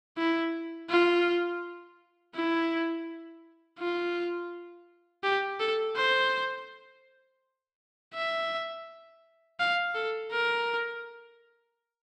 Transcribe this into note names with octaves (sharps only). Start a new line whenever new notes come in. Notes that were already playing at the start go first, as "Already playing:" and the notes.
E4
F4
E4
F4
G4
A4
C5
E5
F5
A4
A#4